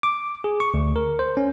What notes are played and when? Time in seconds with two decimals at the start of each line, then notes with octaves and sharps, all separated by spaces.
0.03 D6
0.44 G#4
0.60 C#6
0.74 D2
0.96 A#4
1.19 C5
1.37 C#4